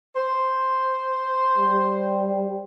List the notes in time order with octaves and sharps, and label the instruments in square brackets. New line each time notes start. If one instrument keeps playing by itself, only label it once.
[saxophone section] C5
[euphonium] G3